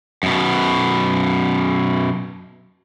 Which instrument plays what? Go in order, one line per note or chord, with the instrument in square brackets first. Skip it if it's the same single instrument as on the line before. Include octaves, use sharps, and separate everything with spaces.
[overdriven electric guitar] F#2 B2